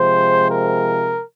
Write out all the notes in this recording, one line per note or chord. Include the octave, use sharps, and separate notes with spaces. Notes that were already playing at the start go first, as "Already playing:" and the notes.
Already playing: C3 F3 G#3 C5
A#4